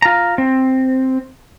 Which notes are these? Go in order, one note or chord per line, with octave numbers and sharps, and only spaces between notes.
F4 A#5
C4